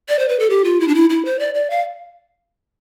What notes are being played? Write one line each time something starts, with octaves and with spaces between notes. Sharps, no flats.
D5
C5
B4
A4
G4
F4
E4
D4
E4
E4
C5
D5
D5
F5